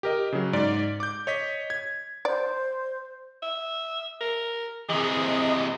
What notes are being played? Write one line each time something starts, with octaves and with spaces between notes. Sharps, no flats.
G4 A#4 D#5
C#3 F#3
G#2 D5
D6 G6
C#5 D#5 B6
G#6
C5 D5
E5
A#4
C3 E3 G#4 D#5